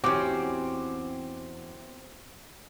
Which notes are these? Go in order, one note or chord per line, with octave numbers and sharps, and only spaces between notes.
E2 C4 C#4 F#4 G4 D6